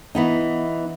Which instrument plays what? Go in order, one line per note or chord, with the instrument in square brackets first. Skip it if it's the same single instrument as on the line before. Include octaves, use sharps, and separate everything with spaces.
[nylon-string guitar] E3 B3 D#4